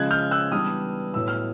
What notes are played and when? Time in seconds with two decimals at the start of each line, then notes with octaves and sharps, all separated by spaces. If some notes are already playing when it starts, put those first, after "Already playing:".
Already playing: C#3 F3 G#3 C#4 F#6 G#6
0.11 F6 G6
0.31 E6 F#6
0.51 E3 G3 B3 D4 D#6 F6
1.14 A2 F#3 B3 E6
1.28 F6